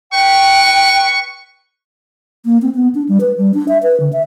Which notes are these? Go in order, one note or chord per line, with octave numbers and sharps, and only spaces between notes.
B4 G5 C#6
A#3
C4
B3
D4
G3
B4
G3
D4
E5
B4
D3
E5